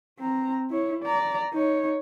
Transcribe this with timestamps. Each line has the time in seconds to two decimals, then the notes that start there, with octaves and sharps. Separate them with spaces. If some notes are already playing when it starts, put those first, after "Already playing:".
0.19 C4 A#5
0.71 E4 C#5
1.03 D5 A#5
1.53 D#4 C#5